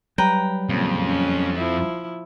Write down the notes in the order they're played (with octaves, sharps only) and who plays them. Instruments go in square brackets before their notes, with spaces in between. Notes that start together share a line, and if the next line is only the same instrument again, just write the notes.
[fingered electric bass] F#3 G3 [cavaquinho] B4 G5 A#5
[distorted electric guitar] F2 [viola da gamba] A#2 C#3 F3
[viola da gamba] C#4
F3 E4